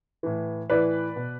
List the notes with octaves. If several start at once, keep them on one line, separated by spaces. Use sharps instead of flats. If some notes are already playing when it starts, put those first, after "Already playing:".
A2 E3
A2 E3 B4 D5
B2